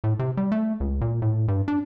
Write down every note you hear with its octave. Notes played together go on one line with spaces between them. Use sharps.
A2
C3
G3
A3
C#2
A#2
A2
G2
D4